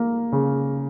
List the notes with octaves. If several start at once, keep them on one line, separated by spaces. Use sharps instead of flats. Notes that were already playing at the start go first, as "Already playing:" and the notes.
Already playing: A#3
C#3